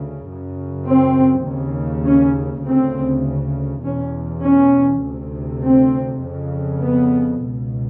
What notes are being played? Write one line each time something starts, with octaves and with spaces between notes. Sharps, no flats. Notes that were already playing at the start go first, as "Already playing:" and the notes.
Already playing: D2 C#3
F#2 C#3
C4
D#2 C#3
C#4
D2 C#3 C4
E2 B2 C#4
C#4
D2 C3
C4
F2 C#3
B3
C#2 B2